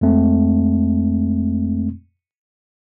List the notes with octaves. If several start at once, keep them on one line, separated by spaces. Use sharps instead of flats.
F2 G#3 A3 C4